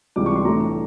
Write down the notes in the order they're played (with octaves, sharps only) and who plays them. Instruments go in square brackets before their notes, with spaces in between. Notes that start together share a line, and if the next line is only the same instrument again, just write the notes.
[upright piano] C#2 C3 E3 G3 D6
C#6
C6
A2 E3 A3 D4 A#5